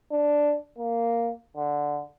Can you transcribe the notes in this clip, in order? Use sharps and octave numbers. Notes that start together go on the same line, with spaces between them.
D4
A#3
D3